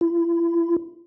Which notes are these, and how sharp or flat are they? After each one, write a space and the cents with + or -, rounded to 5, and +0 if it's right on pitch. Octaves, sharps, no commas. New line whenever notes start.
E4 +40